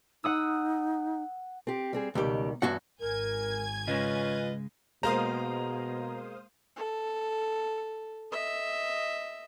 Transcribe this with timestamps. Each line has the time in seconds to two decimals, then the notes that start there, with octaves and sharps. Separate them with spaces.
0.24 D#4 F#5 D#6 E6
1.67 C4 G4
1.93 G3 C4 G#4
2.15 C#2 B2 D#3 G3 G4
2.62 E2 G2 C#4 F#4 F#5
3.00 G#1 A#4 G#5 G#6
3.87 C#3 G#3 C#4 F4 B4 D#5
5.03 B2 G#3 A#3 C5 F5 A#5 D#6
6.76 A4
8.32 D#5 E5